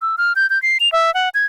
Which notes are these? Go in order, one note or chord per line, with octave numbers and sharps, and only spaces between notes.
E6
F6
G6
G6
C7
F7
E5
F#5
G#6